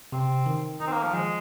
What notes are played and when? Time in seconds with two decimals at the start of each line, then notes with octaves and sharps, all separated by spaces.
0.12 C3 C4
0.46 D#3
0.80 D#3 D#4
0.87 C4
0.92 A#3
1.03 F3
1.13 F3 G#3